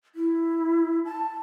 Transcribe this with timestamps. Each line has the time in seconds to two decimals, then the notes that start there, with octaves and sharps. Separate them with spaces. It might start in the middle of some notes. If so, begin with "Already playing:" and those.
0.15 E4
1.05 A5